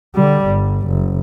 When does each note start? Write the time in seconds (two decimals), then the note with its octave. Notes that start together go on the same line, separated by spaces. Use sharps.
0.15 D3 G3
0.47 G1
0.87 F#1